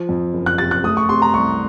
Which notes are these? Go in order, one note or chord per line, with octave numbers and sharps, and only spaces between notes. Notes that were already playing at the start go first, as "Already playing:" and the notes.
Already playing: F3
F2
F#1
F#6
C3 A6
F#6
A3 D#6
C#6
C3 C6
A#5
C2 C#6